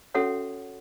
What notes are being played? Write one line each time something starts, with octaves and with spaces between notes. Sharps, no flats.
C#4 F#4 A4 C#5 E5 F#5